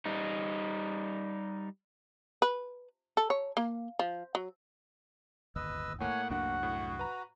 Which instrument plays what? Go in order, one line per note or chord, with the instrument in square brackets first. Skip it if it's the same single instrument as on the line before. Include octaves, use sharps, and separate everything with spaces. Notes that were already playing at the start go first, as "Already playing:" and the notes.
[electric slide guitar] G3 D#4
[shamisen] B4
A4
C#5
A#3
F3
F#3
[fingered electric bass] D1 G1 D#2 [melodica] B4 D#5 E6
[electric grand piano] A2 A3 A#3 [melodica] C#5 G#5 [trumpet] F#5
[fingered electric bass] C2 F#2 D4 [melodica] F#4 [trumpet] F#5
[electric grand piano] A2
B4 A#5